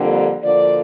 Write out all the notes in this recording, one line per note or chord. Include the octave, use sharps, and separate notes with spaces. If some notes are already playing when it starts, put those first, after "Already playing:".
Already playing: F2 D3 G3 A#3
D2 D3 F3 A#3 D5